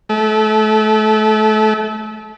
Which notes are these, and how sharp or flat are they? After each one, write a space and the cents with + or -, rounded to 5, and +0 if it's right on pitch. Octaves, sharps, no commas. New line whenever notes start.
A3 -30